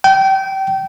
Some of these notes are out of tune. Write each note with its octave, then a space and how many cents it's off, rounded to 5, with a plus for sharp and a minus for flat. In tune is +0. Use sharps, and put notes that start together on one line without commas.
G5 -25